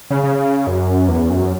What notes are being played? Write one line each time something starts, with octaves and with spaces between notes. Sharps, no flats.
C#3
C#3
F#2
E2
F#2